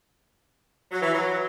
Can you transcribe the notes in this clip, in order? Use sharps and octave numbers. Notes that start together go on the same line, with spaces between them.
F#3
E3
F#3